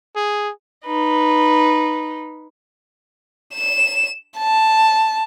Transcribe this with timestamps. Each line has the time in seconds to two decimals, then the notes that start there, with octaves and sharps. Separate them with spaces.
0.16 G#4
0.86 D#4 B4
3.55 E7
4.37 A5